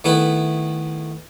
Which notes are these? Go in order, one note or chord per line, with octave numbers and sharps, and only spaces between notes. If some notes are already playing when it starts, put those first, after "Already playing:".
D#3 A3 B3 E4 B4